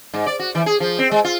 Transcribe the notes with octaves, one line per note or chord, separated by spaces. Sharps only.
G#2
D5
F#4
E3
G#4
F3
C4
G#3
F4